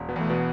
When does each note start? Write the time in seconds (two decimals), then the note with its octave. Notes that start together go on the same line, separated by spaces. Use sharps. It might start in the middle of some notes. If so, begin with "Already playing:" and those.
Already playing: E1
0.08 B2 B3
0.16 E2 A3
0.30 B2 B3